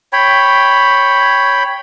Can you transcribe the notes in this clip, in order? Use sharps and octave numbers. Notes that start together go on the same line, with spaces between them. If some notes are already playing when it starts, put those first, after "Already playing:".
C#5 G5 B5